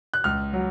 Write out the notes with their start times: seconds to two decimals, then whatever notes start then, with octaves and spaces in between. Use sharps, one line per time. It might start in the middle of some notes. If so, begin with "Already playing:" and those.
0.14 F#6
0.24 C#2 F6
0.53 F#3